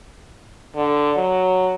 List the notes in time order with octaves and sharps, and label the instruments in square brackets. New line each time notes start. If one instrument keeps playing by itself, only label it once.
[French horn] D3
F#3